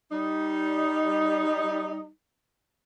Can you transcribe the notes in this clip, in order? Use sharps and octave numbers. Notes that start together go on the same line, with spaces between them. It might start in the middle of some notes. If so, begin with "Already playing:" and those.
G3 D#4